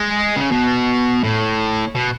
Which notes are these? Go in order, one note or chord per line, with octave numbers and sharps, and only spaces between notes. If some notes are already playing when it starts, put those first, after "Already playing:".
Already playing: G#3
C#3
B2
A2
B2